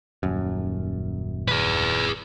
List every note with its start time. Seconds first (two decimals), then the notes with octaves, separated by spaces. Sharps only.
0.23 D#1 F#2
1.48 G#4 B4